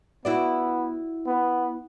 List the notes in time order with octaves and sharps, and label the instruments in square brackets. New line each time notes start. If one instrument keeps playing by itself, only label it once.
[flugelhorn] B3 [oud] E4 F#4 D5
[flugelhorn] B3